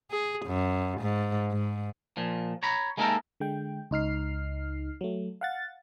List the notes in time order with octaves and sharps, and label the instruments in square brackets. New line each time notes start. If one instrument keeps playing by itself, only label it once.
[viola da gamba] G#4
F#2
G#2
G#2
[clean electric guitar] A#2 F3
C#5 A#5 B5
G#3 A#3 D#4 E4 A4 A#4
[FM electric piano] D3 G#3 G5
C#2 D#4 F6 C7
F#3 A3
F5 F#5 A6